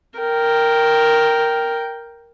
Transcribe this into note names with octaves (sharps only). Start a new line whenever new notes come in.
A#4 G5